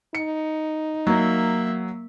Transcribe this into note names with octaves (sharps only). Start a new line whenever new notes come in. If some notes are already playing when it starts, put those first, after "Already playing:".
D#4 C#7
F#3 A#3 E5